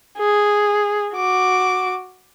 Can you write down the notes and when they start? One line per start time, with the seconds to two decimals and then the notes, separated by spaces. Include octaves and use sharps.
0.17 G#4
1.15 F#4 D6